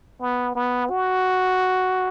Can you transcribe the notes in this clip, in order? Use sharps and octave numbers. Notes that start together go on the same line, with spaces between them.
B3
B3
F#4